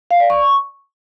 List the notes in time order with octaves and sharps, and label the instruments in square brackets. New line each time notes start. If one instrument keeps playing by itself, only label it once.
[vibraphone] F5
D5
C#6